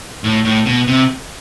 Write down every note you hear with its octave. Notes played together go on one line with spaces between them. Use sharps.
A2
A2
B2
C3